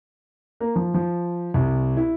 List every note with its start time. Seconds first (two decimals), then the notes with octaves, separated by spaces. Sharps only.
0.60 A#3
0.76 F3
0.94 F3
1.54 C2
1.97 E4